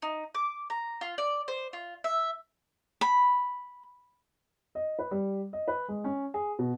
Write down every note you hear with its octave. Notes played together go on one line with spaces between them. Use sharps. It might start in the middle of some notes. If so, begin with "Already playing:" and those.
D#4
D6
A#5
F4
D5
C5
F4
E5
B5
D#5
B4
G3
D#5
B4
G#3
C#4
G#4
B2